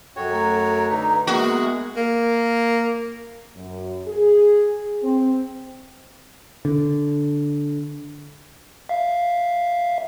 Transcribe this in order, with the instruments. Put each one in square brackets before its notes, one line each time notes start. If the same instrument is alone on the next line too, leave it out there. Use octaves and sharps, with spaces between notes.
[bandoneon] F#2 F#4 C#5 [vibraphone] A4 G5
[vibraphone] A3 A4 [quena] A#5
[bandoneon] D3 D#4 [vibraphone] B4
[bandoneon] G#3 G#4 [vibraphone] A#3 B3 E5 [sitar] F#4 [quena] A#4
[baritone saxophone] A#3
[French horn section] F#2
G#4
C4
[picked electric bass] D3
[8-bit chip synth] E5 F5